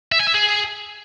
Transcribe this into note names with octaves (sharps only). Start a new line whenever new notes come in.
E5
G#5
E5
G#4